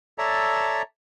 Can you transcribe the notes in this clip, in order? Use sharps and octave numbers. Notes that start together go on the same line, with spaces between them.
A4 C#5 D5 E5 A5 A#5